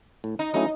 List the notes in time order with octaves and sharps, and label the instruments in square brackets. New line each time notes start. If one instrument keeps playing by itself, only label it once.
[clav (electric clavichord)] A2
[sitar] D#4
[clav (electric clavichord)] F#3 A3 C#4 E4 [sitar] D#4